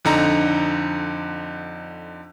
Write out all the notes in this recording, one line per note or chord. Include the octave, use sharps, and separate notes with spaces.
F2 D3 D#4 A#5